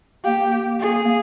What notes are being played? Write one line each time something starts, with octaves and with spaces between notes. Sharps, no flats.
A#3 G4
G#4